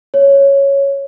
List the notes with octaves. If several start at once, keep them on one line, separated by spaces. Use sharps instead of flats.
C#5